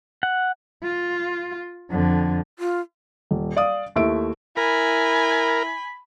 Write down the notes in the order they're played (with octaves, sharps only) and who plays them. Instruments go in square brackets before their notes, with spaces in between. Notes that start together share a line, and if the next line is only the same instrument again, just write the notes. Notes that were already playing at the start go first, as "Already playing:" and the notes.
[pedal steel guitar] F#5
[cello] F4
F2 D3
[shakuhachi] F4
[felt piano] D#1
D5 F5 D#6
D#2 A3 E4 E5 D7
[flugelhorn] E4 [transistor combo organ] A#4 [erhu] G#5 [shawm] B5